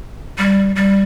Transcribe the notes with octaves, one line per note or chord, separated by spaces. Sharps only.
G3
G3